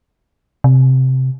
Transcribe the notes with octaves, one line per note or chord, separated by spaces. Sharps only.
C3